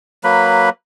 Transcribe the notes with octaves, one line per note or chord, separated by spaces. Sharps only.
F#3 A#3 B4 B5